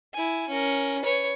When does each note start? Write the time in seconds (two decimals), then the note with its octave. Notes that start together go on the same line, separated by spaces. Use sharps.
0.13 E4 G#5
0.49 C#4 A#4
1.02 B4 C#5